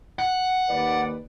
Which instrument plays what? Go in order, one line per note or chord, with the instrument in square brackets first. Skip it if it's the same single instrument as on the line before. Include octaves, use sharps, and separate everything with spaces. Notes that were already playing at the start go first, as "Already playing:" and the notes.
[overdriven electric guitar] F#5
[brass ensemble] D#2 B4 D5